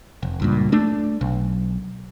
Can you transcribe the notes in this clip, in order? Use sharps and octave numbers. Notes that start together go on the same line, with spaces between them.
F1
C#2 G2 A#2
A3 D4
B1